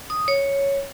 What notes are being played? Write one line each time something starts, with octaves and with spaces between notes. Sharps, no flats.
D#6
C#5